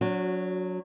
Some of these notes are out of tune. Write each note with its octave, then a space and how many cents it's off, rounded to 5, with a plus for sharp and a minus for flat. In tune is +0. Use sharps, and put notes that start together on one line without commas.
F#3 -15 D4 -45 F#4 +0